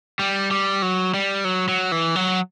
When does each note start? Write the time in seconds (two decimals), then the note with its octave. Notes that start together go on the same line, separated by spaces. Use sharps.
0.19 G3
0.51 G3
0.82 F#3
1.14 G3
1.45 F#3
1.68 F#3
1.92 E3
2.15 F#3